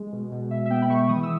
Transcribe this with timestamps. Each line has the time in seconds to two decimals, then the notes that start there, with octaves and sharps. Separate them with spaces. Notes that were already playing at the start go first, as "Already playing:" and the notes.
Already playing: G#3
0.12 B2
0.32 B2
0.51 B2 E5
0.66 E5
0.70 B3 G5
0.82 B5
0.90 G#3 C#6
1.09 E3 D#6
1.23 E6